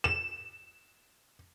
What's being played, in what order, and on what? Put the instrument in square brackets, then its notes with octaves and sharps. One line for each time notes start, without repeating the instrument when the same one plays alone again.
[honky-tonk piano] E7